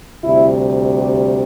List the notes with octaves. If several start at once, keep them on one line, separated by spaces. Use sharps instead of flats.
D2 C3 G3 E4
G4